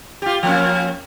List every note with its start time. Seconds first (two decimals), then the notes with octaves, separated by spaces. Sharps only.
0.22 F4 G4
0.43 F3 A#3 C#4